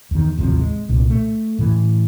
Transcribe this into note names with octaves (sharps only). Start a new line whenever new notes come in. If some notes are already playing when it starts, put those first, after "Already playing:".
E2 D#3
A1 D#2 C3 F3
G#3
C2 A#2
A3
A2 E3